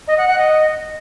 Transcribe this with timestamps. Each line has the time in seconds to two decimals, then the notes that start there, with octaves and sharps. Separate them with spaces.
0.07 D#5
0.18 F#5
0.28 F#5
0.38 D#5